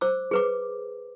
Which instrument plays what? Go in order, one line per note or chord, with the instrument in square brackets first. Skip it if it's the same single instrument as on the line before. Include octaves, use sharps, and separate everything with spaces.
[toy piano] C5 D6 E6
G#4 B4 D6